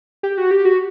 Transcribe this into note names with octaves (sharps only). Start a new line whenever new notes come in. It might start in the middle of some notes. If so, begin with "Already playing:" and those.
G4
F#4
G4
F#4